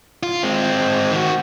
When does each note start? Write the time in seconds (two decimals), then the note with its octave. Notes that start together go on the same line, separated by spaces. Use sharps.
0.23 F4
0.43 G#3 C4
1.11 D#3 F#4